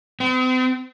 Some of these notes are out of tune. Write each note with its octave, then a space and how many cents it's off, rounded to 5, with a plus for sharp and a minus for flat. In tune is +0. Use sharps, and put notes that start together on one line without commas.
C4 -45